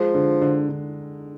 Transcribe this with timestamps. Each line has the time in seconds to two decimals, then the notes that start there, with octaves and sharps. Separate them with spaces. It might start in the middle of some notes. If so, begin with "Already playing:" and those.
Already playing: F3 G#3
0.14 D3
0.42 D3
0.69 D3